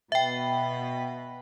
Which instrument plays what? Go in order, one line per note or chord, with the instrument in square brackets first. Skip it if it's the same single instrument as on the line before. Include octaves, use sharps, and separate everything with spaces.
[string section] B2 B4 [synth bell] E5 G5